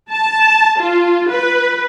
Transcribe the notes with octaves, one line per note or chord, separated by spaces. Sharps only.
A5
F4
B4